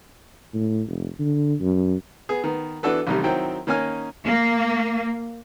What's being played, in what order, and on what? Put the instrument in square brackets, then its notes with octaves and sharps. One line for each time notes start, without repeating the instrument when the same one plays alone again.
[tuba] A2
F1
D3
F#2
[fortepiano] B3 G#4
D#3 B3
E3 B3 D4 F#4 A4 B4
A1 C3 D#3 G3
D#3 F#3 C4 E4 G5
D#3 A#3 C#4 D#4 G#5 F6
[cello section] A#3